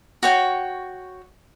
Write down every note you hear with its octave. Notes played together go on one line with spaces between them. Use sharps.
F#4 C#5 G5